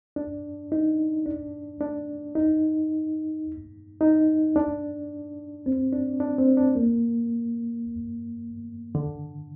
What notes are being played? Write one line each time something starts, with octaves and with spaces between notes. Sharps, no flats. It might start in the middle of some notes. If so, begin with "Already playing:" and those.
D4
D#4
D4
D4
D#4
D#4
D4
C4
D4
D4
C4
D4
A#3
D3